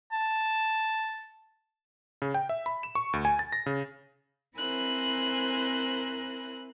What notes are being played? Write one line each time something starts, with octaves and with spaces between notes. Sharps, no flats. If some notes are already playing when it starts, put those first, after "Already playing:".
A5
C#3
G5
E5
B5
E7
C#6
D2
G#5
A6
A#6
C#3
C4 E4 A#4 C5 G#5 F#6